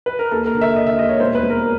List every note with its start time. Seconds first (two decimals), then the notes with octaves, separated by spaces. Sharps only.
0.06 B4
0.19 A#4
0.31 D#2 A4
0.46 A#4
0.54 D3
0.61 E5
0.76 D3 D#5
0.87 E5
0.98 D#2 D#5
1.09 C#5
1.20 E1 C5
1.35 B4
1.43 E1
1.50 A#4